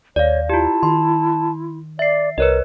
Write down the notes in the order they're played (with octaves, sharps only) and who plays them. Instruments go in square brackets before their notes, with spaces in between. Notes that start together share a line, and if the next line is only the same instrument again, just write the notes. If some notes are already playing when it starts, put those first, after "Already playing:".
[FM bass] D#2 [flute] C#5 [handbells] D5 F5
[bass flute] E4 [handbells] F4 G4 [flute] A5
[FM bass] D#3 [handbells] C6
[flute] D5 [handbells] E5 C7
[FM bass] C2 [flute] A#4 [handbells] B4 C#5 D#5